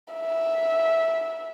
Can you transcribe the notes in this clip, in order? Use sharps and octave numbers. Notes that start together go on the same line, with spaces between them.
E5